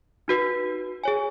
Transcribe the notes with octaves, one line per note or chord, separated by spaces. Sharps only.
D#4 F#4 B4
G#4 C#5 G#5